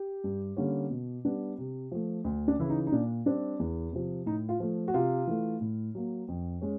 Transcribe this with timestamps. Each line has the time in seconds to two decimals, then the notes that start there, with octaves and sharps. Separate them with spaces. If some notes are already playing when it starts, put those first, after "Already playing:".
Already playing: G4
0.24 G2
0.57 D3 G3 A#3 C#4
0.90 B2
1.25 G3 B3 D4
1.58 C3
1.91 F3 A3
2.25 D2
2.48 D4
2.59 C#3 E3 E4
2.70 D#4
2.87 D#4
2.92 A#2 D4
3.25 G3 C4 D4
3.59 E2
3.93 C3 F3
4.26 A2 D#4
4.49 F4
4.60 F3 A3
4.88 F#4
4.94 C3 F4
5.27 E3 A3
5.61 A2
5.95 F#3 A#3
6.28 F2
6.61 G#3 C#4